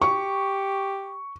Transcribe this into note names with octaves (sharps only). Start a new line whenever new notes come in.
G4 C#6